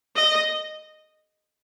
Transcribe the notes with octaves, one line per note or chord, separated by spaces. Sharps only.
D#5